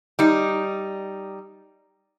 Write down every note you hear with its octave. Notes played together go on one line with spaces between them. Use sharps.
G3 D#4